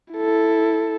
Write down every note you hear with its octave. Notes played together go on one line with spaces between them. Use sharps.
E4 A4